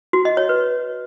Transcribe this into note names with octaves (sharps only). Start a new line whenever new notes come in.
F#4
D#5
C#5
B4